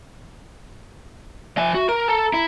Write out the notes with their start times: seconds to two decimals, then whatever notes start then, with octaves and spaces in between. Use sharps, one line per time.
1.57 F3 E5 G#5
1.75 F#4
1.89 A#4 A#5
2.09 A4 A5
2.33 E4